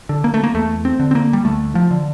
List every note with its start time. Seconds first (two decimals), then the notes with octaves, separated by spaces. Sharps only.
0.09 D3
0.24 A#3
0.34 A3
0.44 A#3
0.55 E2 A3
0.85 C4
1.00 D3
1.11 C4
1.15 A#3
1.33 G3
1.45 D2 A3
1.75 F3
1.91 D3